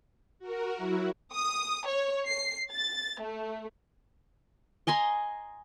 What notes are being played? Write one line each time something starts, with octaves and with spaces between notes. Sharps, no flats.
F#4 A#4
F#3 E4 F#4
D#6
C#5
C7
A6
A3
D#5 G#5 A#5 C6